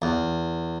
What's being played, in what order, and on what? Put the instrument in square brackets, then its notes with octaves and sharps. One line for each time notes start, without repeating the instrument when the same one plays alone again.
[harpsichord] E2